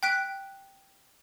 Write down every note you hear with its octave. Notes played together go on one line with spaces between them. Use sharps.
G5 F#6 B6 D7